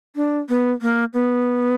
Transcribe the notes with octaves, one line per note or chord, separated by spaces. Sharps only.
D4
B3
A#3
B3